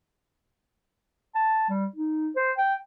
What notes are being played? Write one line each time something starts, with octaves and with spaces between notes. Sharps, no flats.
A5
G3
D#4
C5
G5